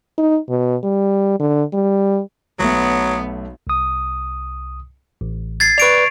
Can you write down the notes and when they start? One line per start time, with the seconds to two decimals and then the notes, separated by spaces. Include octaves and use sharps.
0.18 D#4
0.49 B2
0.83 G3
1.40 D3
1.73 G3
2.60 B1 F#3 A3 B3 D#6
3.67 C2 D#6
5.21 A1
5.60 G#6 A6 C7
5.78 B4 D5 C#6 D7 F7